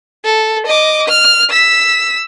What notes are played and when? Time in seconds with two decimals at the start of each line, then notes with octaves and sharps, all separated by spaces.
0.24 A4
0.66 D#5 D6
1.08 F6
1.50 E6 B6